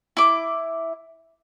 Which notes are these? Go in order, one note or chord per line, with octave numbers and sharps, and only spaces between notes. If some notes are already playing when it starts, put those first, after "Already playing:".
E4 D6